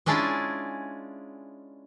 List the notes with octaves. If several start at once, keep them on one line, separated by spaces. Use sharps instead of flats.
G#3 C#4 D4 E4 F4 G#4